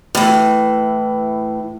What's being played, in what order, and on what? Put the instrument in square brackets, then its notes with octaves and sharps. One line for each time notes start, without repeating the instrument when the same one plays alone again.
[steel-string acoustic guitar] A2 E3